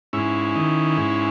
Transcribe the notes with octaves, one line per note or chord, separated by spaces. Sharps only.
G#2 C#4 E4
D#3
G#2